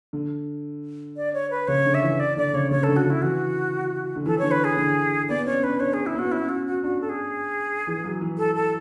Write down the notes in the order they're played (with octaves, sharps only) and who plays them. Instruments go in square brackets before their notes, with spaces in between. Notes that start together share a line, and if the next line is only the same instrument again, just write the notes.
[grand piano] D3
[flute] D5
C#5
B4
[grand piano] C#3 [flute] C#5
[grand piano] D3
[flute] E5
[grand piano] E3
[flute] D5
[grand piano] D3 [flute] D5
[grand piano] C#3 [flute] C#5
[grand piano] C#3 [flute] C#5
[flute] A4
[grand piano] D3
[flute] F#4
[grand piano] D3 [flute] E4
[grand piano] E3 [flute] F#4
[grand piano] D3
[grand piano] E3 [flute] A4
[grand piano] D3 [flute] C#5
[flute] B4
G#4
[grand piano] D3
[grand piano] B3 [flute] D5
[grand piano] C#4 [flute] C#5
[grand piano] D4 [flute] B4
[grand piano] D4 [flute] C#5
[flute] G#4
E4
[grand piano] B3 [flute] F#4
[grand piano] C#4 [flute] E4
[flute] F#4
F#4
[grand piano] D4 [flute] F#4
[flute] A4
G#4
[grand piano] E3
F#3
E3
[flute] A4
A4